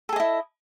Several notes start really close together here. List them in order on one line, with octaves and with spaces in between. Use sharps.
A4 G#4 D#5 E4